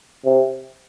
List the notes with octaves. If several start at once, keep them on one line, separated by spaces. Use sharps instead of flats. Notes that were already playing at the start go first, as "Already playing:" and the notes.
C3